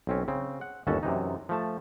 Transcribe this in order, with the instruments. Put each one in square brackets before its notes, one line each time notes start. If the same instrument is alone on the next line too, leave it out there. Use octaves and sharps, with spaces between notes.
[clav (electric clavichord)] B1 C4 C#4
C#3 C4
F#5
G1 D#2 C#4 F#4 A4 A5
F#2 C3 E3 D#4
F3 A3 A5